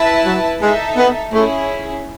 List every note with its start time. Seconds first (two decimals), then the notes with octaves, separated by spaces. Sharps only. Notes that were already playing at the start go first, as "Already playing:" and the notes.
Already playing: E4 B4 E5 A5
0.25 F#3
0.61 G#3 D#4 A4 E5
0.97 B3
1.32 A3 C#4 E4 G#4